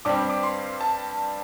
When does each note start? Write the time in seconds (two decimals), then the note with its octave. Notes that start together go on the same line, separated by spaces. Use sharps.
0.05 G2 G3 C4 D6
0.29 D6
0.43 C6
0.81 A5